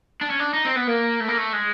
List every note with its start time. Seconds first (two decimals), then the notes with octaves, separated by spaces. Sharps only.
0.21 D4
0.30 C#4
0.39 D4
0.54 D#4
0.65 C4
0.76 B3
0.87 A#3
1.21 A3
1.29 A#3
1.38 A3
1.53 G#3